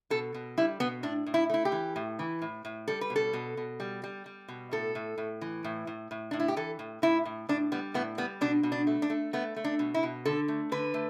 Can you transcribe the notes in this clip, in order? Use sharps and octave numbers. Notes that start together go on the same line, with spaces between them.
B2 A4
B2
G3 E4
B2 B3
A2 D4
A2
E4
A3 E4
G4
E3
A2
E3
A2
A2
G3 A4
B4
B2
A4
B2
B2
G3
G3
G3
B2
A2 A4
A2
A2
E3
A2
A2
A2
A2 D4
E4
G4
E3 A4
A2
A2 E4
A2
A2 D4
G3 B3
A2 B3
G3 B3
B2 D4
B2
D4
A3
D4
A3
A3 B3
A3
D4
B2
E4
B2
D3 A4
A3
D3 B4
A3